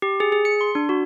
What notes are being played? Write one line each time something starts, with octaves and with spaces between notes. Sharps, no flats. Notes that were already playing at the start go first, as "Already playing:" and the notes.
G4
G#4
G#4
C#7
C6
D4
F#4